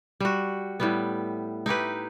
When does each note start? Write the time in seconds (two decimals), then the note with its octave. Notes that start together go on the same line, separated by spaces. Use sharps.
0.20 G3 F#4
0.80 A2 G3 B3
1.66 D#4 E4 G4 B4